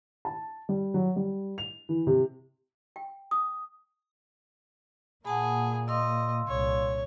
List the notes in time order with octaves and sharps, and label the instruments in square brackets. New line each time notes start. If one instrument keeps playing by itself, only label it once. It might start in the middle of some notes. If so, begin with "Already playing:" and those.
[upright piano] A5
G3
F#3
G3
F7
E3
C3
[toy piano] G5
D#6
[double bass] A#2 A#3 [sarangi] G#4 [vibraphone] F#5 A5 B5
[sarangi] D#5 [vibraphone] F5 C6 E6
[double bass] C2 A#2 [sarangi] C#5